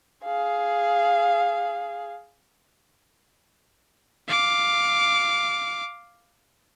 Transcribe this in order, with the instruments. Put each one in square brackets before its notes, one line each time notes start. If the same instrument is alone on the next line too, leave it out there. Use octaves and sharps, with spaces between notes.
[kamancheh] G#4 F5
[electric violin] F5 D6